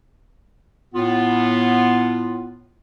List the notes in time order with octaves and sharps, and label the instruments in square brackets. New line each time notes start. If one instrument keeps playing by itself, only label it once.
[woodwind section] A2 B3 F4